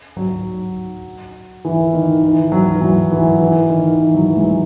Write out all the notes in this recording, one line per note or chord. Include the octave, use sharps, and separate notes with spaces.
F#3
E3
D#3
E3
F#3
E3
F#3
E3
E3
D#3
E3
F#3
E3
G#3
F#3